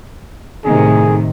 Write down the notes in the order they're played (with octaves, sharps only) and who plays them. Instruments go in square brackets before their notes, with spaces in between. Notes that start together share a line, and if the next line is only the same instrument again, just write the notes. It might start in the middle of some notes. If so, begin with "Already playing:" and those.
[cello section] A2 C3 D#3 [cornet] G#4